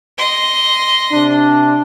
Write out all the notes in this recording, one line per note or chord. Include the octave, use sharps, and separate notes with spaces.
D#5 C6
C3 D4